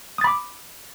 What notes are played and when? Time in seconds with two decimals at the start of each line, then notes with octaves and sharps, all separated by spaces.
0.18 D#6
0.21 A6
0.24 B5
0.27 D6